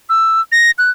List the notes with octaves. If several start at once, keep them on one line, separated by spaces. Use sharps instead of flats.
E6
A#6
F#6